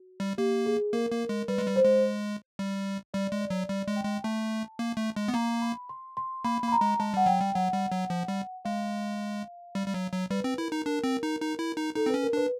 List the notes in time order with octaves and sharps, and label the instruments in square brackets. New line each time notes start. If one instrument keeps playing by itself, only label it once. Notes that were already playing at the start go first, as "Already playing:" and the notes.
Already playing: [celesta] F#4
[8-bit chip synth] G3
[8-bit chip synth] A#3 [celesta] G4
[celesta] G#4
[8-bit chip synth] A#3 [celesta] A#4
[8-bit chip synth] A#3
G#3
[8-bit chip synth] G3 [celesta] B4
[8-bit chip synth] G#3
G3
[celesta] C5
[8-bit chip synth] G#3
G3
[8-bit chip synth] G3 [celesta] D5
[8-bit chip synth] G#3
[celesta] D5
[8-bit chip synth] F#3
[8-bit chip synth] G3 [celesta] D5
[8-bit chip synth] G#3
[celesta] G5
[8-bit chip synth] G#3
[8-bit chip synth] A3 [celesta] A5
[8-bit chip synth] A#3
A3
G#3
B3
[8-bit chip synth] A#3 [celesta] A#5
[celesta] B5
C6
C6
[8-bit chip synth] A#3 [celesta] B5
[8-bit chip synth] A#3
[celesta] B5
A#5
[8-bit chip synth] G#3
[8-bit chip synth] G#3 [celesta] A5
[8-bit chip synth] G3 [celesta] F#5
[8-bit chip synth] F#3 [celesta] G5
[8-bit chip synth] G3
[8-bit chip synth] F#3 [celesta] F#5
[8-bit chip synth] G3
F#3
F3
G3
[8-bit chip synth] G#3 [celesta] F5
[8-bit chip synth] G3
G3
F#3
F#3
[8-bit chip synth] G3 [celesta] B4
[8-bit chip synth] C4
[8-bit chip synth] E4 [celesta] A#4
[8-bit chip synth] D#4
[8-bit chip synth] D4 [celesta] A#4
[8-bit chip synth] C4
D#4
D#4
E4
D#4
[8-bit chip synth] D#4 [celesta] A4
[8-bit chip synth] C4
[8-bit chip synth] C#4 [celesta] B4
[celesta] A#4
[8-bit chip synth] D4 [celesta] B4